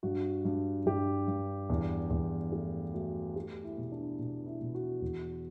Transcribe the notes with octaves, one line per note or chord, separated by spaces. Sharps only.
G2 F#4
G2
G2 G4
G2
E2
E2
A3 G4
A3 F#4
A3 G4
E4
B2
D4
B2
E4
B2
F#4
E2